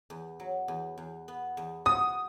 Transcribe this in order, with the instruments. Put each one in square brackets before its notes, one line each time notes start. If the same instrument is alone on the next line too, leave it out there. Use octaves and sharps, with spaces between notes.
[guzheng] E2
F#3
E2
E2
B3
E2
[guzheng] F#4 [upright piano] D#6